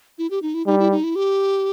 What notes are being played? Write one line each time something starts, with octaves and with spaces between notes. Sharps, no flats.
E4
G4
D#4
E4
G3 D#4
E4
D#4
E4
G4